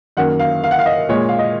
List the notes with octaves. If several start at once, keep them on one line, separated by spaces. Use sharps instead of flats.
F#2 D#3 A#3 F#5
F5
F5
F#5
F5
D#5
A#2 G#3 C#5
F5
D#5